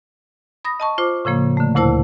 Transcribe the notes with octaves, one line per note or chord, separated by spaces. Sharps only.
B5 D#6 A#6
D#5 A5 C#6
F4 C5 D6
A2 C#3 F3 A#3
D3 A3
D2 A#2 E4 C5 A5 E6